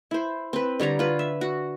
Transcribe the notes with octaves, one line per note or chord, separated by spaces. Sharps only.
E4 C5
C4 B4
D3 G3 C#5 A#5
F4 B4
E5
F#4